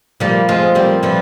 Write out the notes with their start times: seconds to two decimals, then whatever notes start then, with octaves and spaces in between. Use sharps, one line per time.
0.20 F3 G3 A#3
0.49 G#3 C4 F4
0.75 G3 A#3 C4
1.03 E3 F3 G3